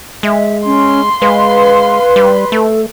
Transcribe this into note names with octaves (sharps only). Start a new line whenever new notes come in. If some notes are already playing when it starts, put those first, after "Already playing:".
G#3 E5
C#4 C6
G#3 B4 F5
G3
A3 A4